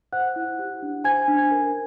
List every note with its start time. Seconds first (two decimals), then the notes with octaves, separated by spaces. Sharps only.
0.13 C5 F#5 F#6
0.36 E4
0.59 G4
0.82 D4
1.04 C5 G#5 G#6
1.28 D4
1.51 A#4